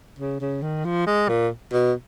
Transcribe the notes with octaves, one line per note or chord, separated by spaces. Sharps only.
C#3
C#3
D#3
F3
G#3
A#2
B2